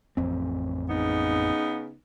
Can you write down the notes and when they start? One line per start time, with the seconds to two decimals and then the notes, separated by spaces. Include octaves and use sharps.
0.17 A1 F2 C4
0.89 C#3 B3 D#4